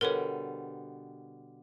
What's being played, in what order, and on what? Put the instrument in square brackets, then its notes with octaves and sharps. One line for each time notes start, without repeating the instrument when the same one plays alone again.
[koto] B2 D3 G3 [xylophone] A#4 B4 C#5